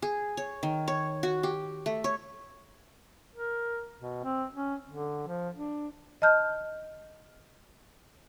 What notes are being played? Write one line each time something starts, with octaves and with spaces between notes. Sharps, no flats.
G#4
C#5
D#3
C#5
F#4
G4
A3
C#5
A#4
B2
C4
C#4
D3
F3
D4
D#5 A5 F6 G6